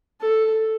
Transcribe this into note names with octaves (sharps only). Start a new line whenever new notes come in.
A4